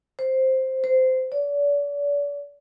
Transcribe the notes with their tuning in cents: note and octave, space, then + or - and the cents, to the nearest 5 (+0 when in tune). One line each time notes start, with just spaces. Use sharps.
C5 +5
C5 -15
D5 -40